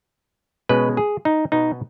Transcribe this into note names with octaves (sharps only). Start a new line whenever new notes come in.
B2 G#3 C#4 B4
G#4
D#4
B2 B3 D#4